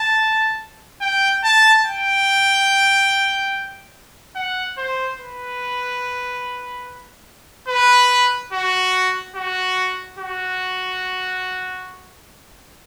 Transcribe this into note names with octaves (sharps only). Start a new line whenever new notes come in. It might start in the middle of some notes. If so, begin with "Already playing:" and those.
Already playing: A5
G5
A5
G5
F#5
C5
B4
B4
F#4
F#4
F#4